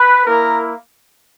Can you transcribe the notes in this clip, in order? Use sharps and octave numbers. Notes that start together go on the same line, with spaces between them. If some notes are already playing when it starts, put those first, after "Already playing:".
Already playing: B4
A#3 E4 A#4